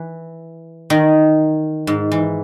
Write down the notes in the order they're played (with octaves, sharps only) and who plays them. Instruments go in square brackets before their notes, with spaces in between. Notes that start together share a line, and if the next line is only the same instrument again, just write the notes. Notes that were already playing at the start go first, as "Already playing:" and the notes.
Already playing: [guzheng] E3
D#3
G#2
E3